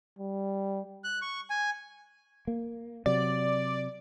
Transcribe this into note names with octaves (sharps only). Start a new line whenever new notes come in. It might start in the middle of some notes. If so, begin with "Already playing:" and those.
G3
F#6
C#6
G#5
A#3
C3 F#3 D5